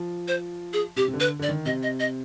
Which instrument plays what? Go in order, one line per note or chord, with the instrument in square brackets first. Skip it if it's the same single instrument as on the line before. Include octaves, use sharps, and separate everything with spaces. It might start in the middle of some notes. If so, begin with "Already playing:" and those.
Already playing: [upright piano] F3
[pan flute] C5
G#4
[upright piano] C3 [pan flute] G4
[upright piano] C3
D3
[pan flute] B4
[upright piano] D3 [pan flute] D5
[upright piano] D#3
[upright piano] C3 [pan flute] D#5
[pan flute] D#5
D#5